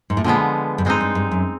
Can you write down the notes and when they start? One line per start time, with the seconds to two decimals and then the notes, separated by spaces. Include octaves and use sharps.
0.10 G#2
0.17 A2
0.24 A#2 D3 F3 G#3 B3
0.78 G2
0.85 G#2 G#3 C4 D#4
1.01 G2
1.15 G2
1.31 F#2